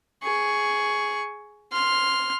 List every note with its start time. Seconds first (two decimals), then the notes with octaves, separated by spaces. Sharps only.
0.23 G#4 C#6
1.73 C6 F6